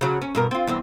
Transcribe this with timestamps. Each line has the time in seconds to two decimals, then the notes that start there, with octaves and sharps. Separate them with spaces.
0.01 C#3 F#3
0.22 C#4
0.35 G2 B2 A#4
0.51 C4 F4
0.67 E2 G2 C4